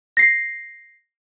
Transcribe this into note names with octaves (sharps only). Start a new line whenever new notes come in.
A#6 C7